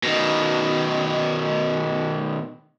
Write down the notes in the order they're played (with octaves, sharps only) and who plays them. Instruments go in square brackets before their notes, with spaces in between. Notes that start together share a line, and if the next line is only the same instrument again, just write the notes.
[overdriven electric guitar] B2 D#3